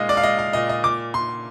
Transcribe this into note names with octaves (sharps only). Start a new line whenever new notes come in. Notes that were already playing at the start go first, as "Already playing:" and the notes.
Already playing: A#2 G#3 D#5 F5
D5
F5
G#3 D#5
F5
A#2 D#5
D#5
A#2 D6
A#2 C6